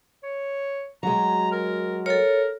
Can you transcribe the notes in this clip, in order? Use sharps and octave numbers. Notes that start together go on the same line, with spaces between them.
C#5
F#3 G#3 A#5
A#4
A4 A#4 C#5